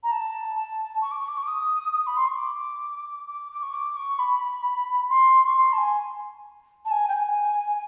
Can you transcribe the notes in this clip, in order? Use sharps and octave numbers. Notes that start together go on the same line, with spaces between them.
A#5
A5
A5
C#6
D6
C#6
D6
C#6
D6
D#6
D#6
B5
C6
C#6
D6
D6
D6
C#6
D6
C#6
B5
C6
C#6
C6
A5
G#5
A5
G#5
G5
G#5